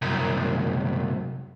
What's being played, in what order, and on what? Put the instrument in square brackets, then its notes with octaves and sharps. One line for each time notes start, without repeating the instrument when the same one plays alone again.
[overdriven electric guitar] C2 F#2